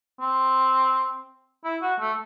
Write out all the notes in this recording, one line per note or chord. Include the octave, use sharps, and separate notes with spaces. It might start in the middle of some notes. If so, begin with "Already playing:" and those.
C4
E4
F#4
A3